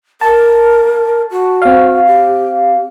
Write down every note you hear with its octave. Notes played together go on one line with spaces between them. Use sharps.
A#4 A5
F#4
C4 F5
G4